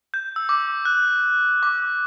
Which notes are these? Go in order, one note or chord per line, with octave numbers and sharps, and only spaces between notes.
G6
E6
D6
F#6
D6